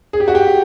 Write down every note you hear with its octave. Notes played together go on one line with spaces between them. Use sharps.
G#4
G4
F#4
G4